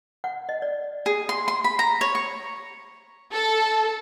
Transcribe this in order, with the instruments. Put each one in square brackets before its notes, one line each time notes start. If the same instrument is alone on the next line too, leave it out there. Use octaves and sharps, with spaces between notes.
[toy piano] F#5
D#5
D5
[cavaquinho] G#4
C6
C6
B5
A#5
C#5
C#6
[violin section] A4